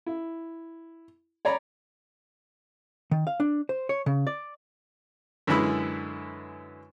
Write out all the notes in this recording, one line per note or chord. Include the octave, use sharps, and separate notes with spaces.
E4
C#5 D5 A#5 B5
D#3
F5
D4
C5
C#5
C#3
D5
F#2 D3 E3 G#3 B5 E6